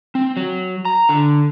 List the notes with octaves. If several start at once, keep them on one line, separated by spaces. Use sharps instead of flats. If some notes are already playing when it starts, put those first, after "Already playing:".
C4
F#3
A#5
D3